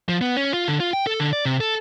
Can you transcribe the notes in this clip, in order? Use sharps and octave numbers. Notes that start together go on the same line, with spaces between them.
F3
B3
C#4
F4
D3
F4
G5
A4
D3
D5
C3
A4